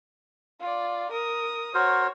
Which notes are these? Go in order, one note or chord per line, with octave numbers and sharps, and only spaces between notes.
F4 D5
A#4 D#6
F#4 A#4 C5 C#5